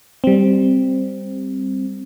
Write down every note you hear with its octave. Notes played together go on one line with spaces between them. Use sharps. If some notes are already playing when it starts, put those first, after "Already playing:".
G3 C4